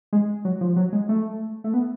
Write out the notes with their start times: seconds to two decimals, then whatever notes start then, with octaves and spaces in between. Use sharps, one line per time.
0.13 G#3
0.45 F#3
0.61 F3
0.76 F#3
0.93 G#3
1.09 A3
1.64 A3
1.74 B3